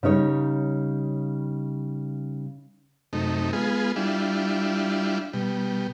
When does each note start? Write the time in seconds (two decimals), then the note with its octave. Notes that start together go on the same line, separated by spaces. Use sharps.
0.03 C#3 G3 D#4 C#5
3.13 F#2 C3 A3 D#4
3.53 G#3 B3 F4 G#4
3.96 G3 D4 E4 F4
5.33 B2 G3